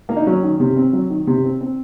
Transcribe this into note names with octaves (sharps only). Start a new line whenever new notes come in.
A#3
D#4
F#3 C#4
D#3
C3
C4
F#3
D#3
C3
C4
C4